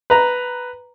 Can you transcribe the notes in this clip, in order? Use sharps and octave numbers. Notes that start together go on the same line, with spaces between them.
B4 A#5